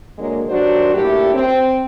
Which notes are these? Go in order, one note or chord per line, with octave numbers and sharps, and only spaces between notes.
D3 F#3 G#3 A#3
G2 D#3 F#3 D4 F#4 C5
G2 A#2 A3 E4 G4
C4